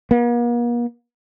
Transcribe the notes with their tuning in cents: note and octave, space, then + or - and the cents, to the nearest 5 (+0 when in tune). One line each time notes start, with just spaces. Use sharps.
A#3 +45